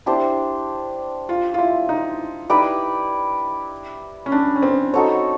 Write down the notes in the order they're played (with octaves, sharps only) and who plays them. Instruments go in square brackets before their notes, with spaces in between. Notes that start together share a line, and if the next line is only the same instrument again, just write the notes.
[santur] D4 G4 C5 [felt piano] E4
[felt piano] F4
F4
E4
D#4
[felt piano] D#4 [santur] E4 G4 B4 D5
[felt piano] C#4
D4
C#4
C4
[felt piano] C4 [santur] D#4 F#4 A4 C#5